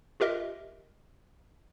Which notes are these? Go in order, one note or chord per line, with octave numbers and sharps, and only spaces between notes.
F4 G4 A#4 D#5 E5